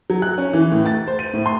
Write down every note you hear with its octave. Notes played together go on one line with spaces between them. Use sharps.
F#3
F#6
C#4
E3
A2
A6
C5
D#7
A2
C6